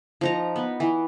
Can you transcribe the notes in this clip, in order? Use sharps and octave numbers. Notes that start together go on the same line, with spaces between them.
F3 D#4 A#5
B3
E3